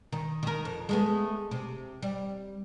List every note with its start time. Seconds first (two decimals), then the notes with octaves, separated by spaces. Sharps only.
0.12 D#3
0.43 D#3 A#4
0.65 F2
0.89 G#3 A3 B3
1.51 C3
2.03 G3